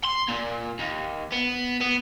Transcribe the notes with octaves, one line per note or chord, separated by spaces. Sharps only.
C6
A#2
D#2
B3
B3